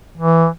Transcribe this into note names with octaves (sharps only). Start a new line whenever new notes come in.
E3